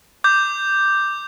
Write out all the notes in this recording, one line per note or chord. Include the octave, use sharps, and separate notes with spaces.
D6 G6